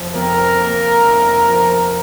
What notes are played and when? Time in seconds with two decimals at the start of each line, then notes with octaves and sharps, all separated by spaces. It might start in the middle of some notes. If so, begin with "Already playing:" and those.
Already playing: F1 F3
0.15 F2 A#4
0.60 A#3
1.04 F1
1.49 F3